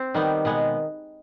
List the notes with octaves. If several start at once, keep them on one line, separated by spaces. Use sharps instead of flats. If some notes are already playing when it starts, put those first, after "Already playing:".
Already playing: C4
D#3 G3 B3
B2 G#3 B3